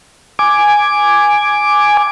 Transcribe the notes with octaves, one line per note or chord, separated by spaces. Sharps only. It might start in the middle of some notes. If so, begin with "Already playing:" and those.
G#5 D6